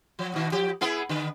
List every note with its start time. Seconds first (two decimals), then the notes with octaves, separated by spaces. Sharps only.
0.19 F3
0.34 B2 D#3
0.52 F3 G4
0.81 B3 E4 G#4
1.09 D3 B4